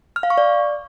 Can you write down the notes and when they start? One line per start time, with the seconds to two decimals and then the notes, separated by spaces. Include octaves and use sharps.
0.16 F6
0.23 F5
0.30 C#6
0.38 D5